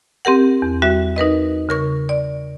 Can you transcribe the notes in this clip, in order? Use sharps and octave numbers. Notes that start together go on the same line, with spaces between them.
C4 G4 A#4 F#5
E2
G3 F#4 E5
D#4 A#4 B4 D#5
C#3 A#4 C#6
D5